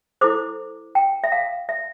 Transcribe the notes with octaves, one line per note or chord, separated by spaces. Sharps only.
E4 A4 C5 D6
G5
E5
F5
E5